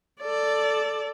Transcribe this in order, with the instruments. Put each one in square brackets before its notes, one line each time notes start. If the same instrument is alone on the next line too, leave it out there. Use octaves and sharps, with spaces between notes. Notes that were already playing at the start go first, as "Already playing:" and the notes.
[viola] A4 D5